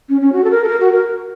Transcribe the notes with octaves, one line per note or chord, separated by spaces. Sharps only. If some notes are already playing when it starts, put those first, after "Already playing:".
C#4
C#4
F#4
A4
A#4
A4
A#4
F#4
A#4